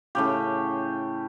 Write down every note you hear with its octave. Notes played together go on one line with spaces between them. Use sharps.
A2 C#3 G4